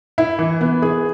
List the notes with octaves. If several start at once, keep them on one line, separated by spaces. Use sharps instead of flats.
E4
E3
B3
G#4